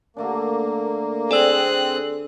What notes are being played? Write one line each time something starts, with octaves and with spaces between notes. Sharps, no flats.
D3 A3 A#3 D4
C4 G#4 A4 D5 G#5 E6 F#6